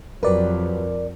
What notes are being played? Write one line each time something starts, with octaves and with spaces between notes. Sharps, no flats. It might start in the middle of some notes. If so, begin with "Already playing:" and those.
F2 F#3 G4 A#4 B4 D5